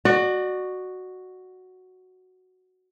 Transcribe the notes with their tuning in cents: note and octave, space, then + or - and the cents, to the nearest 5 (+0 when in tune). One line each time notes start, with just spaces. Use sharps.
F#4 +0 D5 +35